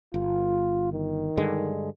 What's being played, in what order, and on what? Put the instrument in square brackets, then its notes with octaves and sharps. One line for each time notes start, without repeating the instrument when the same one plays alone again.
[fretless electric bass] G1 [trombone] F4
[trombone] D#3
[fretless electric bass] G2 D3 G#3